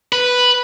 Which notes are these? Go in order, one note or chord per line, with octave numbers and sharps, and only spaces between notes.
B4